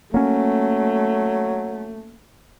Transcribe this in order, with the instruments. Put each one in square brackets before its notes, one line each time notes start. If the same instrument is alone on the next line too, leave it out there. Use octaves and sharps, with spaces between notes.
[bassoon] F#3 [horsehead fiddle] A3 [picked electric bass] A#3 C#4